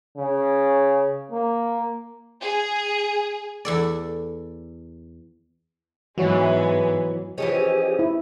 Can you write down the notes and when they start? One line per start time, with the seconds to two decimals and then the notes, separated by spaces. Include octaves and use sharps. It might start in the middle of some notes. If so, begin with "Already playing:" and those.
0.17 C#3
1.31 A#3
2.41 G#4
3.65 E2 A4 D5
6.18 G#2 E3 F#3 G#3 B3 F#4 C#5
7.38 E3 F3 C#4 G4 G#4 D#5
7.99 E4